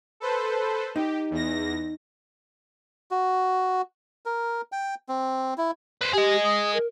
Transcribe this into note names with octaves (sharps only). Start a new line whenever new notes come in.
A4 B4 C5
D#4 G4
E2 A#6
F#4
A#4
G5
C4
E4
B4 C5
G4 G#4 D#5
D#6
A#4